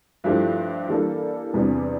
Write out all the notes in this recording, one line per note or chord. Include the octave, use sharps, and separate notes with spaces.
G2 F3 A3 E4 G4
E3 G3 A#3 D4 A4
E2 C3 G3 D4